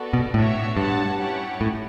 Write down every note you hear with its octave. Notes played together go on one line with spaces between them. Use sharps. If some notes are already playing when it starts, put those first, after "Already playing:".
Already playing: B3 F#4 A4 D5
B2
A2 D4 F#4 C#5 E5
G2 F#4 C#5 F#5 A5
C#4 E4 G4 C#5 F#5
A2